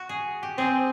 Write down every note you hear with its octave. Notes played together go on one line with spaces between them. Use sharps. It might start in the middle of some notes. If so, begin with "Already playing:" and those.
Already playing: F#4
G#4
G4
C4 G#4